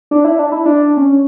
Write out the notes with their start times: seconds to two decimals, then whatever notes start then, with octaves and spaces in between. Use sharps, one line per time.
0.11 D4
0.25 E4
0.39 D4
0.52 E4
0.65 D4
0.97 C#4